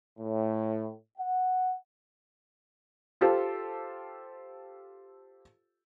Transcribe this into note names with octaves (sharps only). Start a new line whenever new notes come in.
A2
F#5
F4 G4 A4 C5